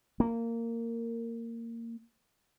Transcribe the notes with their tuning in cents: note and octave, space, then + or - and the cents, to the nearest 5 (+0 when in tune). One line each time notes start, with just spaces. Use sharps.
A#3 -15